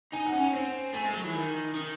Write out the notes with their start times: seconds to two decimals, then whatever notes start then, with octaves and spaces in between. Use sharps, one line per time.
0.13 D#4 G#5
0.26 F#5
0.33 C#4
0.40 G#5
0.53 C4
0.93 A3 G#5
1.05 G#3
1.14 F#3
1.25 E3
1.34 D#3
1.74 D#3